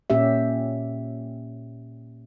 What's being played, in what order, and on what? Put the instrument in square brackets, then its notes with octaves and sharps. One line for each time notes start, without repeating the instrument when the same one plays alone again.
[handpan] A#2 C#4 G4 E5